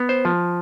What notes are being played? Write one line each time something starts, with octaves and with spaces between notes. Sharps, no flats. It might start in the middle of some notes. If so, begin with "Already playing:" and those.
Already playing: B3
C5
F3